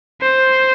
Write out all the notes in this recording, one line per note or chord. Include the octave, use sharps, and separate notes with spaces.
C5